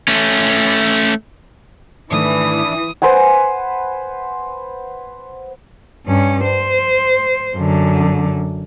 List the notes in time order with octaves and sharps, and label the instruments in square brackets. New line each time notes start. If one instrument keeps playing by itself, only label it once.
[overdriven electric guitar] A3 C#4
[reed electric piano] G#2 D#3 A3 [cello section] E3 [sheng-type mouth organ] D4 E4 [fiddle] D#6
[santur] B4 C5 F#5 G#5
[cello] G2 C#4
C5
F#2 D3